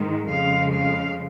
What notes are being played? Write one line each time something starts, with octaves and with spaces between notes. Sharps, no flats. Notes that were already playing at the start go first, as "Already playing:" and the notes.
Already playing: G#2 D#3 G#3
F2 C#3 G#3 F5
F5